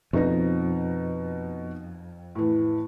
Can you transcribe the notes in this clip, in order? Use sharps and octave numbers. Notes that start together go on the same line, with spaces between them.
F2 B2 D#4 A#6
A2 E3